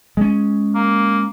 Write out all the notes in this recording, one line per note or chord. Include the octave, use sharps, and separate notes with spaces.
G#3 C#4
A#3